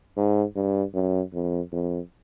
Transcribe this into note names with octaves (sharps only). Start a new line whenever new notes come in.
G#2
G2
F#2
F2
F2